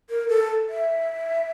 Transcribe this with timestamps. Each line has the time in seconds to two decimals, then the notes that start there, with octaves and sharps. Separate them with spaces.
0.10 A#4
0.29 A4
0.69 E5